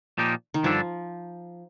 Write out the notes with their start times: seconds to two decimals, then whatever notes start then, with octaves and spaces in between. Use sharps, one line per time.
0.18 A#2 F3 A#3 D#4 G4
0.54 D#3
0.64 G2 D3 F3 G3 D4 A4